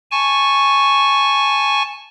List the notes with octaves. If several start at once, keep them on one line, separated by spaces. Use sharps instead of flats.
G#5 A5 C#6